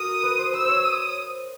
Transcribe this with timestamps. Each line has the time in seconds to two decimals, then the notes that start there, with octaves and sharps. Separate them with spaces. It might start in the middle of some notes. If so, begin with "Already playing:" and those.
Already playing: F#4 A#4 D#6
0.23 B4
0.38 C5
0.53 C5 E6
0.65 C5 C#5
0.85 D#6